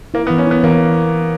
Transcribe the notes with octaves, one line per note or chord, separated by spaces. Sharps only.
A#3 E4
B3
E3
C#4
B3 E4
E3 A#3